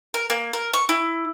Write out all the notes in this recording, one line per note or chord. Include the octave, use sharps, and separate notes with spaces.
A#4
A#3
A#4
C#6
E4